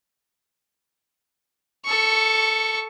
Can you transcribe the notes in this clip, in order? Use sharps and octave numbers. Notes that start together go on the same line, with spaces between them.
A4 C#6